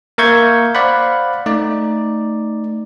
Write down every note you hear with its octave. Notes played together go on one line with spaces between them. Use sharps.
A#3 A#4 E5 C#6 G6 G#6
C5 D5 F5 F#5 B5
A3 D#4 D5